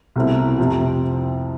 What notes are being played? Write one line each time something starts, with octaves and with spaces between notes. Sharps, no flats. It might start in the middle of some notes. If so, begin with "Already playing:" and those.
C2 B2 A3 C4 E4
F2 C3 F3